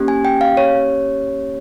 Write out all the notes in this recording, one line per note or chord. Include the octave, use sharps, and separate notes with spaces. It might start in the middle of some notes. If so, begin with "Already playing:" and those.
Already playing: A#3 C#4 G4
G#5
G5
F5
C#5